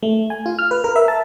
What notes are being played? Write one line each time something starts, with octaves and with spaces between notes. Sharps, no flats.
A3
G#5
F4
F6
B4
A#4
E5
A5